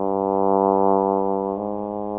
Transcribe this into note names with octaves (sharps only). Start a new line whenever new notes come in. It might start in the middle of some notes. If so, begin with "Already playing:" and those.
Already playing: G2
G#2